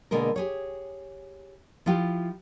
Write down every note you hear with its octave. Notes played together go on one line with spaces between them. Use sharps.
B2 D3 G#3 A#3 A#4
G4 G#4 C#5
F3 E4 F4 G4